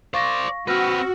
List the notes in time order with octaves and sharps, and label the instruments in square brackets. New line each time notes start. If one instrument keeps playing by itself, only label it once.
[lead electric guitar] C5 D5 [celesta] F5 C#6 A#6
[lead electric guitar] C4 B4 [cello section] F#4 [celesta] E6 F6 A#6